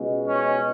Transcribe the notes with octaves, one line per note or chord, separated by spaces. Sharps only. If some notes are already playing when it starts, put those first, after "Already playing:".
Already playing: C#2 B2 G#3
C#4